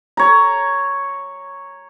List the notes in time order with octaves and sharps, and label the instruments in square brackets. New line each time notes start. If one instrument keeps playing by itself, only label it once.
[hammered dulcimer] C#5 A#5